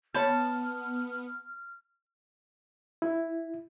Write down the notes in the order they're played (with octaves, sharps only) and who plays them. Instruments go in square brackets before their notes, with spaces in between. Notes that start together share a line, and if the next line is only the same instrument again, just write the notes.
[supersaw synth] B3 [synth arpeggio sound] C#5 B5 G6 [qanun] A5 [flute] F6
[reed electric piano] E4